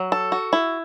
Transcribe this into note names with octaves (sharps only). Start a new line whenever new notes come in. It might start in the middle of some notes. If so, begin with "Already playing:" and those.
Already playing: F#3
A4
F#4
E4